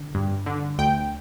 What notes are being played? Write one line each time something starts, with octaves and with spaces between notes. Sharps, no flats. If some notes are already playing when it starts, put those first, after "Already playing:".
Already playing: D3
G2
D3
D2 G5